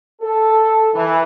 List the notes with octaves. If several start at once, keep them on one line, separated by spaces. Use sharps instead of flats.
A4
E3